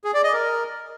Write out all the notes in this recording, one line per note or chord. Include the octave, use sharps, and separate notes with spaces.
G#4
D5
D#5
A#4